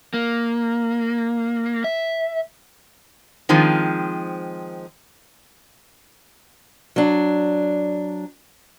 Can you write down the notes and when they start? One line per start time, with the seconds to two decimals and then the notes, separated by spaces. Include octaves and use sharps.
0.14 A#3
1.84 E5
3.49 D#3 F3 G#3 C4
6.96 F#3 D4